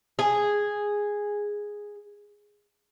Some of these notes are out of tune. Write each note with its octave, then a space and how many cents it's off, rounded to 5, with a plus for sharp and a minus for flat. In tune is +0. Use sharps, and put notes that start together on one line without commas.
G#4 -5